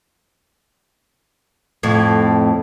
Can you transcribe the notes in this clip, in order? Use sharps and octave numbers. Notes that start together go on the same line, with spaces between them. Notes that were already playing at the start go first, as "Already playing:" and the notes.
F2 A2